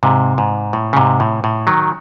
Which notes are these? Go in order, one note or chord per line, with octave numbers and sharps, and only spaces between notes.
G#2 C3
G#2
A2
C#3
G#2 C3
A2
A2
D#3 F#3